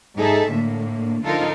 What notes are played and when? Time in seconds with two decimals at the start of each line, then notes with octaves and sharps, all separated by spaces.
0.15 G#2 D#4 G#4 A4 E5
0.49 A2 D3 A3 A#3
1.23 D3 F3 D#4 F4 A4 A#4